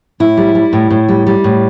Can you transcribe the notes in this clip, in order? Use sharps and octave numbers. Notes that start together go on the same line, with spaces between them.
A2 E4
G3
G3
A2
A2
G3
G3
A2